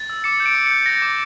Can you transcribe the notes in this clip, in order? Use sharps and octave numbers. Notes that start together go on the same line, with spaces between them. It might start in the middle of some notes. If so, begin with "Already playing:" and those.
Already playing: A6
E6
D6 C#7
G6
D7
D6
G6 C#7
G6 A#6
D6